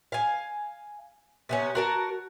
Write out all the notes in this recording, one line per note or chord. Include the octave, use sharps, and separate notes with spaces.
F5 G#5
C3 B3 C#4
F#4 A#4 A5